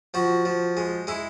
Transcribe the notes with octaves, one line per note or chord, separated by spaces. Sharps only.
F3 F#4
F3
G#3
G#3 E4